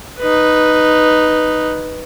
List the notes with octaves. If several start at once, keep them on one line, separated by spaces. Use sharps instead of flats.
D#4 B4